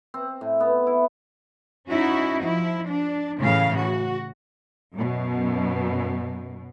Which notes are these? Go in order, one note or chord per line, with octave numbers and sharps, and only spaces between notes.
C4
A2
B3
E4
C#4 D#4 E4 F#4
F3 E4
D4
A2 C#3 E3 F5
F#4
F#2 B2